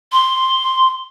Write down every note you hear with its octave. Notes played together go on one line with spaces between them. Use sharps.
C6